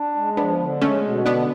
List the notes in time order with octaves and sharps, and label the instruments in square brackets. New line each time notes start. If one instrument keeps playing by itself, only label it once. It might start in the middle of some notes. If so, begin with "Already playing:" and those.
Already playing: [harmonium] D4
G#3
[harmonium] F3 [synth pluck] B3 D4
[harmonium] D3
[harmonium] G#3 [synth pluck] A3 C#4
[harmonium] B2
[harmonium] D3 [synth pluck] B3 D4